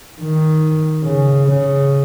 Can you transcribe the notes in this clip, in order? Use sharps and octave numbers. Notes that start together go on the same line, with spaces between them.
D#3
C#3
C#3